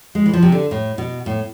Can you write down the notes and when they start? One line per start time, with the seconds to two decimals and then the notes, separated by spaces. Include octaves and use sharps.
0.15 G#3
0.26 E3
0.33 F3
0.42 C3
0.52 D3
0.71 A2
0.98 B2
1.26 A2